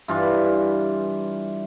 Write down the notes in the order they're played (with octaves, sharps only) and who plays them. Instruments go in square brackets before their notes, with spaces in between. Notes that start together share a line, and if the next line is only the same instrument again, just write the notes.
[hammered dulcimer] G2 E3 F4